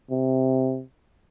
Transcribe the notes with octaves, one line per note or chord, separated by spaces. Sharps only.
C3